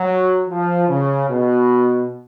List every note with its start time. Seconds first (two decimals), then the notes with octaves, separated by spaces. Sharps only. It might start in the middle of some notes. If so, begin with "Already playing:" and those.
Already playing: F#3
0.49 F3
0.89 C#3
1.29 B2